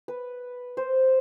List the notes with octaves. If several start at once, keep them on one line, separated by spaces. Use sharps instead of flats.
B4
C5